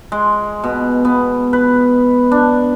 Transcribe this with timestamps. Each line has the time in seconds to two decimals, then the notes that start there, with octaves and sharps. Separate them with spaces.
0.12 G#3
0.64 B2
1.05 B3
1.53 B4
2.31 D4